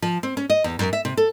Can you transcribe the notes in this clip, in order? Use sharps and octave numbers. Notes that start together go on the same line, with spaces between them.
F3
C4
C#4
D#5
E2
F#2
E5
C3
A4